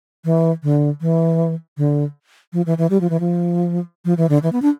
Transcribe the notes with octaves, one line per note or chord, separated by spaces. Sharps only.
E3
D3
E3
D3
F3
E3
E3
G3
F3
E3
F3
F3
E3
D3
E3
B3
D4